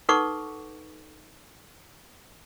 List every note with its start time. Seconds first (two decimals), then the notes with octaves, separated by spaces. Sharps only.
0.09 D#4 A4 B4 F#5 C#6 D6